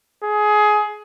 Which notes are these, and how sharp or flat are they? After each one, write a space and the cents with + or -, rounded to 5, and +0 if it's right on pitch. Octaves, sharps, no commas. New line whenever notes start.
G#4 +20